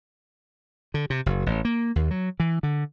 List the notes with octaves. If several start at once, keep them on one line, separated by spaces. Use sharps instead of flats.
D3
C3
F#1
A1
A#3
D#2
F#3
E3
D3